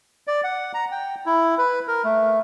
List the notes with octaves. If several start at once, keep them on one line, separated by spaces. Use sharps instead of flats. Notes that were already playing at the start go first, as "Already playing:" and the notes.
D5
F#5
A#5
G5
E4
B4
A#4
A3